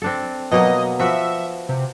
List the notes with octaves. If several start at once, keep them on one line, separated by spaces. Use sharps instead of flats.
C4 D4 A4
B2 F#3 A#3 D#5
F3 F#4 B4 E5
C3